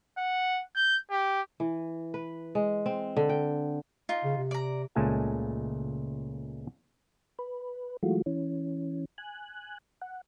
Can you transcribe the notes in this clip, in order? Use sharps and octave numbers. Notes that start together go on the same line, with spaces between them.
F#5
G6
G4
E3
B4
G#3
C4
D3
G5
D#4 F4
C#3
C3
D5 A#5
C#2 A#2 G#3 A3 G#5 A5
B4
E3 F#3 G#3 A3 F4 F#4
E3 C#4
G#5 F#6
F#5